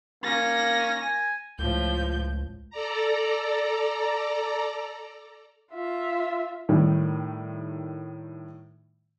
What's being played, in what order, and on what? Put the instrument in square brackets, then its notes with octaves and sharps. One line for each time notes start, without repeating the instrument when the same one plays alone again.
[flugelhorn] A#3 [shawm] C#4 [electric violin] A#6
[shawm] G#5
[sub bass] C#2 [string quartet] A2 F3 G6
[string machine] A4 D5 A#5
[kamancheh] F4 E5
[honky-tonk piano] A2 D#3 G3